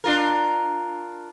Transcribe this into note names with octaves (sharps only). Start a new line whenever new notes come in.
D4 F4 A#4